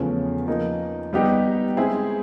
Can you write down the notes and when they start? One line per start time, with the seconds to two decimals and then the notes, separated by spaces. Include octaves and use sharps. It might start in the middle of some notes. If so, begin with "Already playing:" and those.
Already playing: E2 C#3 F3 A3 C#4
0.47 F3 A#3 D#4
1.13 G3 B3 D#4 G4
1.77 G#3 C4 E4 G#4